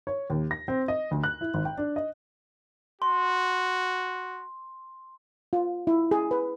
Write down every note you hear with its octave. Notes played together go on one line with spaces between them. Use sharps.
C#5
D#2
A#6
C4
D#5
D2
F#6
E4
G#1
G5
D4
D#5
F#4 C6
F4
E4
G#4
B4